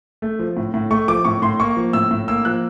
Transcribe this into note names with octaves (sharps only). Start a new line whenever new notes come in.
A3
F3
A2
A2
A3 C#6
F3 D6
A2 C#6
A2 C6
A#3 C#6
F3
A2 E6
A2
A#3 E6
F3 F#6